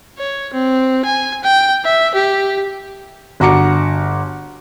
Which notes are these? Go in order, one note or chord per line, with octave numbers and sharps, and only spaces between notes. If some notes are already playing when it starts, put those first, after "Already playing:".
C#5
C4
G#5
G5
E5
G4
G1 F#4 A#5 D6 C#7